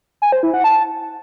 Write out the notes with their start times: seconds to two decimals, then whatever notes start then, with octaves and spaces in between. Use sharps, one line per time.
0.22 G#5
0.32 C5
0.43 E4
0.54 F#5
0.64 A5